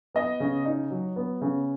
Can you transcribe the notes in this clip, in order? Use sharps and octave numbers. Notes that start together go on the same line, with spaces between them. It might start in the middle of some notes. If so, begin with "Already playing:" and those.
B3 D#5
C#3
D#4
F#3
B3
C#3